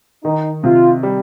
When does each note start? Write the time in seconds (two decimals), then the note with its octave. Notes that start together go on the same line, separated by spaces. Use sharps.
0.24 D#3 D#4
0.64 C3 F4
1.03 G3